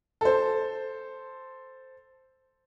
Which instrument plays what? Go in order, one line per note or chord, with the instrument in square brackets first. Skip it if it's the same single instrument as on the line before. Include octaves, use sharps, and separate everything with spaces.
[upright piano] A4 C5